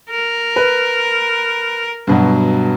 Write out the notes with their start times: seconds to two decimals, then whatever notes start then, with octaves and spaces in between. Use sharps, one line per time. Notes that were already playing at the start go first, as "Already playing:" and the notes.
0.10 A#4
0.56 B4
2.07 G2 B2 F#3